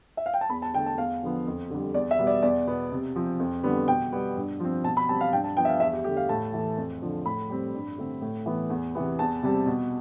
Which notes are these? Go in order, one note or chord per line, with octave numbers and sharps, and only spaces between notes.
E5
F5
G5
A5
E2 B5
A5
D3 A3 G5
A5
E2 F5
D3 F3 B3
F2
D3 G3
E2 D5
E5
B2 G3 B3
D5
E2 D5
B2 B3
C3
F3 C4
F2
D3 G3 B3
B2 G5
G3 B3
G2
F3 C4
B2 A5
B5
G3 C4 A5
F5
G2 G5
A5
F3 B3 G5
E5
F5
E2 E5
G4
D3 A3 G4
F5
A2 A5
E3 A3
F2
D3 F3
A2 B5
G3 C4
G2
D3 A3 C4
A2
E3 B3
E2
C3 E3 B3
E2 A5
C3 G3 C4
B2